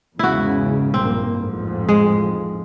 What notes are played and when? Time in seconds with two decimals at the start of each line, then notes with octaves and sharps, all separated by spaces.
0.19 E2 G#2 C#3 E4 F#4
0.94 A#1 G2 A#3 C4
1.33 A1 F2 G#2
1.89 G#3